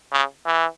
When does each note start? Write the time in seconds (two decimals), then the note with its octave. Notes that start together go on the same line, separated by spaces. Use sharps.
0.13 C#3
0.46 E3